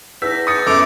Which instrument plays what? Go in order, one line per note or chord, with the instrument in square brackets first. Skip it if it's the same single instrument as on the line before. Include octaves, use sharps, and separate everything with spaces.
[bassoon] E2 [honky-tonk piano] E6 B6 [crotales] G6 A#6
[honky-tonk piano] D#6 C#7 [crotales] G6 A6
[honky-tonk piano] F#2 B3 [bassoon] A3 [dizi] D6 [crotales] E6 D7 F7